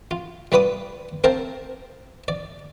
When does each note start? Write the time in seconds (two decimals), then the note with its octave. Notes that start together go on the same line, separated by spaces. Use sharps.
0.11 F4
0.52 G3 F4 B4 D6 D#6
1.24 C4 A#4 C5 F5 A5
2.28 D5